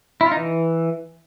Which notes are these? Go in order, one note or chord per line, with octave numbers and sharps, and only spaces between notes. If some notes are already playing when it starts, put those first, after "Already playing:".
E4
F4
D#4
E3